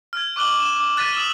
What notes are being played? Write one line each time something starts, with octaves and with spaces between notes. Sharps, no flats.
F6 G#6
C#6 D6 F#6 F#7 G7
E7
D6 E7
F#6 A6 B6 D#7
D#6 E6 E7 F#7 G7